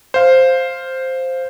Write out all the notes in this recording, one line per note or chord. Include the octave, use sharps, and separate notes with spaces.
C5 F5